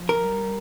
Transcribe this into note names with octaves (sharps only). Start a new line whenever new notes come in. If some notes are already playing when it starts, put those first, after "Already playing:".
Already playing: F3
A#4
G3